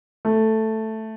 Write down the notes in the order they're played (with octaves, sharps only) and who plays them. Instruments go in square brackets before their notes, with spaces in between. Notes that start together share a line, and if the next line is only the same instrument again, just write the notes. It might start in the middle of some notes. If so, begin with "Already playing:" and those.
[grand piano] A3